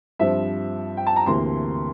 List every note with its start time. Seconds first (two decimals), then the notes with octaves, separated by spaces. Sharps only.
0.19 G2 F3 C4 E5
0.97 G5
1.07 A5
1.16 A#5
1.26 D2 C3 E3 A#3 C6